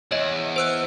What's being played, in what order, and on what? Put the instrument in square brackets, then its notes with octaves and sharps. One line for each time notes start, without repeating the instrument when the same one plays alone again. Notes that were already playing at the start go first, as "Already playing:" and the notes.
[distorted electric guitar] E2 [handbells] C#5 D#5
[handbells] C5 E6 F#6